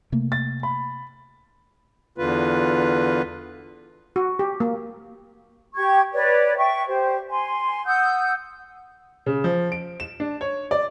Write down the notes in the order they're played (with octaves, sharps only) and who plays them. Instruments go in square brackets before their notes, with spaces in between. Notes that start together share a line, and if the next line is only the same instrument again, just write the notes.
[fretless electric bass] C3 A3 A#3
[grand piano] A6
B5
[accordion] E2 D3 F4 B4
[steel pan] F#4
G4
A#3
[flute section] G4 C#6 G#6
B4 C#5 D5
E5 G5 C#6
G4 C5
G#5 C6
F#5 D#6 E6 G6
[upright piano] C#3
F3
D7
E7
D4
C#5
D5